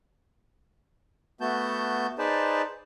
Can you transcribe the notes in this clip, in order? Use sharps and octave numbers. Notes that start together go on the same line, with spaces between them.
A3 B3 F#4 A5 G6
D#4 G#4 B4 C5 D5 A5